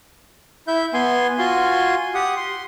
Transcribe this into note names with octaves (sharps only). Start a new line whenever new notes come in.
E4 E5 G6
B3 G#5 C6
F4 F#4 G#5 C6
G4 F#5 D#6
C6